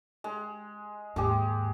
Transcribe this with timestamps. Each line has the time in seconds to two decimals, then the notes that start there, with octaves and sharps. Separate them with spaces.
0.24 G#3
1.16 D#2 G#2 G#3 G4